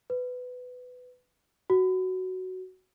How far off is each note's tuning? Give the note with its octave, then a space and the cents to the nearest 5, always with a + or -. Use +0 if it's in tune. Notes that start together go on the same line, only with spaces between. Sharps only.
B4 +15
F#4 +5